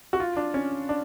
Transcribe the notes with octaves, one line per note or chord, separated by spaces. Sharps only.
F#4
F4
D4
C#4
D4